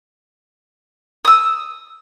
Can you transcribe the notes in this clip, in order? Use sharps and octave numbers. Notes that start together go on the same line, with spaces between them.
D#6 E6